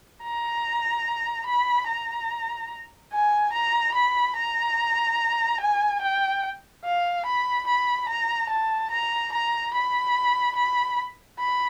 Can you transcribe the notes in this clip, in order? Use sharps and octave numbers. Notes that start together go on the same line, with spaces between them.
A#5
B5
A#5
G#5
A#5
B5
A#5
G#5
G5
F5
B5
B5
A#5
A5
A#5
A#5
B5
B5
B5